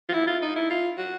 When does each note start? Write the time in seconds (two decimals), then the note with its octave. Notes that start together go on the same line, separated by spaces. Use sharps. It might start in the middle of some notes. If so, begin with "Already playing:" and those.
0.09 F4
0.14 E4
0.27 F4
0.42 D#4
0.56 E4
0.70 F4
0.98 F#4